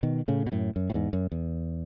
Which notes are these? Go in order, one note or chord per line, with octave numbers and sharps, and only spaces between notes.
B2 D#3
A2 C#3
B2
F#2 A2
F#2
A2
E2 G#2
F#2
E2